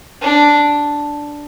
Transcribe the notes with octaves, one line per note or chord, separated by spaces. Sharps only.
D4